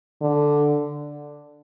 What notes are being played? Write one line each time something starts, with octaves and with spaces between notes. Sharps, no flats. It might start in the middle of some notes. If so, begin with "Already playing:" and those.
D3